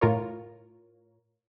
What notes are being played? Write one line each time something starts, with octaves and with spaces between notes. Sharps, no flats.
A2 F4 A#4 C#5